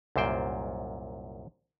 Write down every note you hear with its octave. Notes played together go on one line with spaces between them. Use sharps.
C2 F#2 A#2 C5 G5